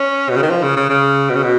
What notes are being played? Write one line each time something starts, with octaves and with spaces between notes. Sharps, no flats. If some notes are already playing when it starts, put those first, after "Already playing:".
Already playing: C#4
B2
C#3
D#3
F3
C#3
C#3
C#3
B2
C#3
B2